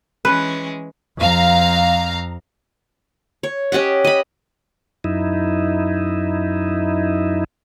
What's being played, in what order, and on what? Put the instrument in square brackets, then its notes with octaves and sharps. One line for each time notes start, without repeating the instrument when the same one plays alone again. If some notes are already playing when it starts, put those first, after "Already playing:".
[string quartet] E3 G#3 C#4 [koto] B4
[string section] F2 F5 A#5
[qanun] C#5
C#4 G4 D#5 F#5
D#5 B5
[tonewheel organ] F#2 D#4 E4